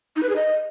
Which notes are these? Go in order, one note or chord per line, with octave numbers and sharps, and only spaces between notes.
D#4
B4
G#4
D#5